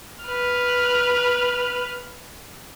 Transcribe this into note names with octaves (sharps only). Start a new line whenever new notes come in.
B4 F6